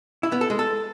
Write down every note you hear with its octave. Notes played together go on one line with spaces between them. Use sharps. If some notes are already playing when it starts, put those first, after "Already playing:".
E4
B3
A4
G#3
A4